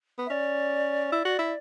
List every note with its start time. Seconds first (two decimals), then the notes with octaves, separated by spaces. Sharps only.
0.18 B3
0.26 E5
0.30 C#4 D5
1.12 E4
1.25 F#4
1.39 E4